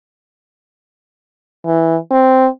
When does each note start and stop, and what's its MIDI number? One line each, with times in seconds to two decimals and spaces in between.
1.66 1.96 52
2.11 2.47 60